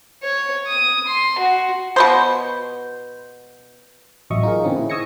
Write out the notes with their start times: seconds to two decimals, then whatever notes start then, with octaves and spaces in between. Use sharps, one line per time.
0.23 C#5
0.67 D#6
1.08 C6
1.38 F#4
1.96 B2 B3 C5
4.30 A1 F#3 D#5 E5 C#6 D#6
4.43 D#4 F4 G#4 A#4
4.64 A#2 D3 E3 C4 C#4
4.76 E4 G#4
4.90 C#6 D#6 E6 G#6 A#6 C#7